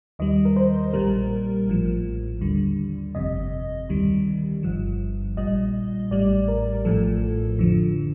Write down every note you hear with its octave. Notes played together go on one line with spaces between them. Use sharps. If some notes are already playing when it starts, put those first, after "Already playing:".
D#2 D#3 G3 D#5
A#4
C5
A#1 A#2 G3 A#4
A1 A2 F3
D#2 D3 G3
G1 F2 C3 D#5
D2 C3 D#3 G3
G1 G2 F3
A#1 A#2 G3 D#5
A1 A2 G3 D5
A#4
A1 A2 F3 A4
F2 D3 F3